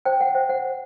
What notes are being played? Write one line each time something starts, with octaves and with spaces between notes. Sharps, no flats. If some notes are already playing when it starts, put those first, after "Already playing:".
C5 G5
C5 F#5
C5 E5
C5 F#5
C5